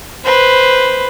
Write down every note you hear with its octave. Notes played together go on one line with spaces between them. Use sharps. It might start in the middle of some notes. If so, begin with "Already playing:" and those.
B4 C5